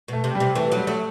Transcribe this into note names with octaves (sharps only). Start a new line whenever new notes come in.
B2 A3
C3
G3
C3
E3 A3
F#3
G3
F#3 A3